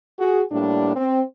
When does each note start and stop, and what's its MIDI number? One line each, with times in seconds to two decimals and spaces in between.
0.20 0.43 66
0.20 0.43 68
0.52 0.92 45
0.52 0.92 55
0.52 0.92 58
0.52 0.92 62
0.96 1.23 60